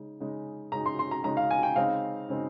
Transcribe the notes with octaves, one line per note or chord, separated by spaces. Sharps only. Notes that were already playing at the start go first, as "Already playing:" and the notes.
Already playing: C#3 G#3 D#4
C#3 G#3 D#4
C#3 G#3 D#4 A#5
C6
C6
A#5
C#3 G#3 D#4 A#5
F5
G#5
G5
C#3 G#3 C4 D#4 F5
C#3 G#3 C4 D#4